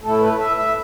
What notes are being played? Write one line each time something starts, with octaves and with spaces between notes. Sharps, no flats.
A2 A3 E4 A4
B4
E5
E5